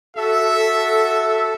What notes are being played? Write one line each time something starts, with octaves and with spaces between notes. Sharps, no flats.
F#4 A4 E5